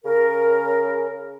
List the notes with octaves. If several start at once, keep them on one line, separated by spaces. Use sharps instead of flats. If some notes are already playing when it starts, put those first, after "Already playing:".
C#3 A#4